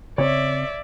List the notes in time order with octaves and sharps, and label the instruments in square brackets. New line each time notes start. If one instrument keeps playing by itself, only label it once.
[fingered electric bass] C#3 C4 [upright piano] C#5 [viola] D5 E5